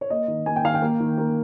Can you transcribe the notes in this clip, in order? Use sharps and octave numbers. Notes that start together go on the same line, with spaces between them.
C#5
A#3 D#5
D#3
A#3 G#5
G5
D#3 F5
G5
A#3
D#3
A#3